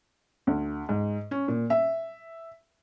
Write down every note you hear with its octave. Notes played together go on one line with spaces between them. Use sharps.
D2
G#2
C#4
A#2
E5